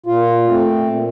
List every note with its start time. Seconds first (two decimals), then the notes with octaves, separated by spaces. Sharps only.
0.06 A#2 F4
0.47 A3 C4
0.88 A#2